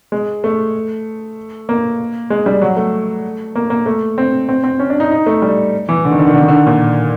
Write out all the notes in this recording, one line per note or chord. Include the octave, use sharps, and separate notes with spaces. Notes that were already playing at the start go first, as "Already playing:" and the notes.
G#3
A3
A#3
G#3
G3
F#3
A3
A#3
A#3
A3
C4
C4
C4
C#4
D4
D#4
D#4
A3
G3
E3
D3
D#3
D3
D#3
D3
D#3
D3
A#2